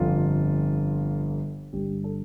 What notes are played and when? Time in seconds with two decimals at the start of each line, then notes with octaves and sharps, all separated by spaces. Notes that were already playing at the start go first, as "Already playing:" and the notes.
Already playing: G1 F2 D3 F4
1.73 G1 G2 D3 G4
2.04 A4